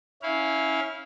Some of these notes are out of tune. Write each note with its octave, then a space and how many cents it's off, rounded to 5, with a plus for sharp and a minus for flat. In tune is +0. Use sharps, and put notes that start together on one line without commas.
C#4 +5 E4 -20 F5 +0